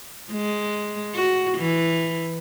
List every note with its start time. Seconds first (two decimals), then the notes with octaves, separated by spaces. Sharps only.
0.32 G#3
1.15 F#4
1.58 E3